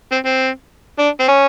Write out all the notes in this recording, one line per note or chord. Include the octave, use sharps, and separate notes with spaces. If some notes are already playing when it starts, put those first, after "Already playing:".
C4
C4
D4
C4
C#4